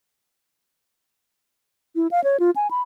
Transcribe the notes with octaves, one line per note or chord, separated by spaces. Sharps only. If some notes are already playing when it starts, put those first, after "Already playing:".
E4
F5
C#5
F4
G#5
B5